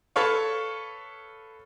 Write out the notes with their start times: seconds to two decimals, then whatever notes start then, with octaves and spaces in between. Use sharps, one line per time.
0.16 A4 B4 C#5 F5